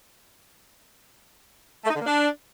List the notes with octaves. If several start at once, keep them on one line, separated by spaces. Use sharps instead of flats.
A3
D#4
D3
A#3
D4